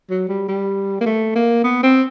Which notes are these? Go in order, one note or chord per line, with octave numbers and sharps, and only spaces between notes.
F#3
G3
G3
A#3
A3
A#3
B3
C4